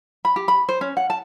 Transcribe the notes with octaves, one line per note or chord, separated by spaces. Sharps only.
B5
G4
B5
C5
C#4
F#5
A5